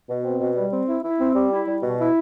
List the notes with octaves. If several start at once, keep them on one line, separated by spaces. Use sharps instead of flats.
B2
C4
B2
G3
C4
E4
E4
C4
G3
E4
G3
B2
E4